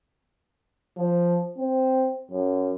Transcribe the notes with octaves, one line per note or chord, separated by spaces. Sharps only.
F3
C4
F#2